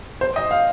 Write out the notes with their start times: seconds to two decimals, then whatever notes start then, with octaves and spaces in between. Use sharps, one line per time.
0.21 C5
0.36 D#5
0.51 F5